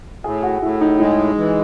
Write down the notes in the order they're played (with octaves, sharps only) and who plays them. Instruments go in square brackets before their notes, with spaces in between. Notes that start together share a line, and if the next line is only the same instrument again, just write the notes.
[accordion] A2 [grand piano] G#4
[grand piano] F#4
[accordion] A2 [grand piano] E4
[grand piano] D#4
[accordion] G#3 [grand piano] D#4
[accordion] E3